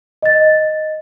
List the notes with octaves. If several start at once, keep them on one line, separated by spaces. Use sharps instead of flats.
D#5 A6